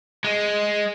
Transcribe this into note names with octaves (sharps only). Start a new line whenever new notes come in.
G#3